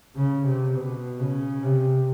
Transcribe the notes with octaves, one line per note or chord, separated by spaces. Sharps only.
C#3
C3
B2
C#3
C3